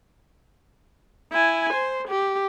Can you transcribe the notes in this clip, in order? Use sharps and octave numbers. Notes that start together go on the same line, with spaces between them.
E4 G#5
C5
G4